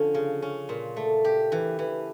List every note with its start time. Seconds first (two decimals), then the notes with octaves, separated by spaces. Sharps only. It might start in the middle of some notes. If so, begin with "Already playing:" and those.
Already playing: D3 F3 C#4
0.14 C#3
0.42 C#4
0.69 A#2
0.96 A3
1.25 G4
1.52 E3
1.79 E3